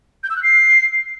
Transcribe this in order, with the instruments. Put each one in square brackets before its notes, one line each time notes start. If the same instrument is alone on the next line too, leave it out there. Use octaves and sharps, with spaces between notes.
[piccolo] G6
E6
F#6
C7